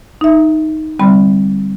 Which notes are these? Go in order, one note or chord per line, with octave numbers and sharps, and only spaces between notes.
D#4 E5
D3 G3 C4 B5